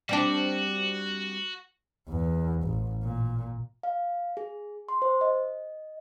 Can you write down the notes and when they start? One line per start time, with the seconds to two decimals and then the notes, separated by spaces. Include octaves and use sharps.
0.09 G3 C4 D4 F#4
2.09 E2
2.64 A1
3.03 A#2
3.83 F5
4.37 G#4
4.89 C6
5.02 C5
5.21 D#5